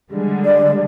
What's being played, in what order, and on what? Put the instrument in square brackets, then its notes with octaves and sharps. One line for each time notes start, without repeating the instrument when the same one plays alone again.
[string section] D3 G3 G#3
[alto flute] D5